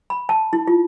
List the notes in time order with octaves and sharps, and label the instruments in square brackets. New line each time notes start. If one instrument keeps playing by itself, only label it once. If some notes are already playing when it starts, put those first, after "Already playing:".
[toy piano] B5
A5
E4
F4